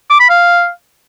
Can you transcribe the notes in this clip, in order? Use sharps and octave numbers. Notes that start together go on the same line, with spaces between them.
D6
B5
F5